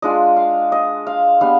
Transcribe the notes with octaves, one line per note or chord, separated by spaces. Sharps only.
G#3 D4 F4 D#5
F5
D#5
F5
G3 B3 D4 F5